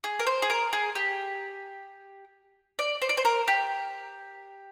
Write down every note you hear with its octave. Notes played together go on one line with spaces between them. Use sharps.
G#4
A#4
C5
G#4
A#4
G#4
G4
D5
C5
D5
C5
A#4
G4